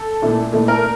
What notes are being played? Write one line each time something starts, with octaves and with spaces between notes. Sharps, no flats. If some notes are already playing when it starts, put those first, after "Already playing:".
Already playing: A4
A#2 A3 E4
A#2 A3 E4
A#4